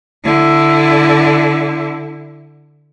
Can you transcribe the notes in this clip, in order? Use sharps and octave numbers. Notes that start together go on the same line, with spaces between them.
D3 E4